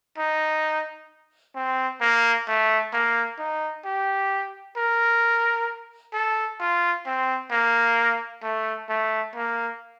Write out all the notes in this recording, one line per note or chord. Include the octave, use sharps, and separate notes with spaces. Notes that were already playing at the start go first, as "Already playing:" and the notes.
D#4
C4
A#3
A3
A#3
D#4
G4
A#4
A4
F4
C4
A#3
A3
A3
A#3